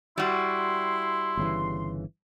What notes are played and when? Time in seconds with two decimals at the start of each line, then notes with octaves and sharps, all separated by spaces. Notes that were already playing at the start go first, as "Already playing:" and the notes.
0.18 G3 E4 F#4 C6
1.37 G1 C#3 E3